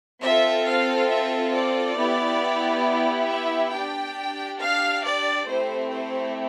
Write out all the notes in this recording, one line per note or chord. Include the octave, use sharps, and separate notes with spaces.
C4 F4 A4 E5
F5
E5
D5
B3 E4 G4
E5
D4 G4 G5
F5
D5
A3 C4 E4 G4 C5
C5